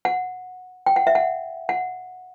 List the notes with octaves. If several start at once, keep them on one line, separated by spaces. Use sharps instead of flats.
F#5
G5
F#5
E5
F#5
F#5